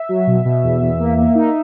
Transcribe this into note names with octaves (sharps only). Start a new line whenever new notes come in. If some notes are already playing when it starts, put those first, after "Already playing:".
Already playing: E5
F#3
B2
B2
E2
E2
A#3
A#3
D#4